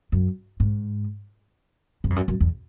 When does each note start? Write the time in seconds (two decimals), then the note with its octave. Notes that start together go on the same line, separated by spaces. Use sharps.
0.12 F#2
0.60 G#2
2.04 G2
2.10 F2
2.16 F#2
2.28 F#2
2.41 E2